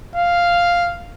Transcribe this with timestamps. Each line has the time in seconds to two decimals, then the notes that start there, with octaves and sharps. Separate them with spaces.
0.16 F5